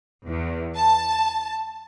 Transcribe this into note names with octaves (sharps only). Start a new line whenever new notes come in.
E2
A5